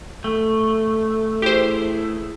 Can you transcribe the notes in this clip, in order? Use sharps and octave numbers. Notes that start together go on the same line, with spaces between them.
A3
E3 E4 G4 G#4 C5